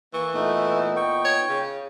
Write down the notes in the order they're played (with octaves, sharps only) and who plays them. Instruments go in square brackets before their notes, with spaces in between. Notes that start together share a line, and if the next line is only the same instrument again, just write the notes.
[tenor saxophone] E3 [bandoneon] A#3 [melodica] C#6
[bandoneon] A#2 B3 D#4 [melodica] A3
[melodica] G5 C#6
[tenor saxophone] C#5
C#3